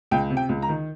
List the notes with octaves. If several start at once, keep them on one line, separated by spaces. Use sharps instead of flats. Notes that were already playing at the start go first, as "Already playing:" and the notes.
C#2 G5
C3
G5
C#2
A#5
D#3